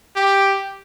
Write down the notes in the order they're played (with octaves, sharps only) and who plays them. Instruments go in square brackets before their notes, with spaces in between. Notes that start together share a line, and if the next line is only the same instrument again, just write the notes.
[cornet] G4